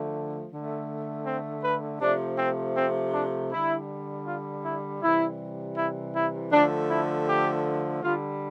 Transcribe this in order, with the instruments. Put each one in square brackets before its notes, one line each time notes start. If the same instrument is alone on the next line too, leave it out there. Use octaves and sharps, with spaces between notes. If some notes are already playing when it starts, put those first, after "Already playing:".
Already playing: [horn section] D3 F3 A3
D3 A3
C4
B4
C3 F3 A3 D4
C4
C4
D4
D3 G3 E4
F4
E4
C3 E3 G3 E4
E4
E4
D3 F3 A3 D4
E4
G4
D3 G3 F4